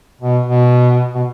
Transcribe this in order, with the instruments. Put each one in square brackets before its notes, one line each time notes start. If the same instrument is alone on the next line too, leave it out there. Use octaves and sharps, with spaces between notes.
[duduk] B2
B2
B2